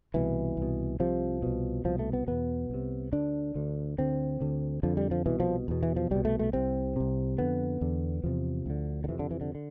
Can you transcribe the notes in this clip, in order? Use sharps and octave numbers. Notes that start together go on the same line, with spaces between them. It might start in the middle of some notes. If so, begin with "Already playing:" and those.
C2 B2 E3
C2 B2
C2 C3 F3
C2 B2
C2 B2 F3
A3
B3
E2 B2 B3
C2 C3
D2 D3 D4
D2 D3
D2 D3 C4
D2 D3
F2 D3 F3
G3
F3
C2 B2 E3
F3
E2 B2
E3
F3
C2 B2 G3
A3
A3
C2 C3 C4
C2 C3
F2 D3 B3
E2 D3
E2 C3 F3
D2 D3
D3
F2 C3 E3
D3
E3
D3
D3